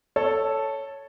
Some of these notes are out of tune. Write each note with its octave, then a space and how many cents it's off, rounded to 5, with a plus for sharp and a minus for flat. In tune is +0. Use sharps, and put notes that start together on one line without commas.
A4 +0 C#5 +0 A5 +0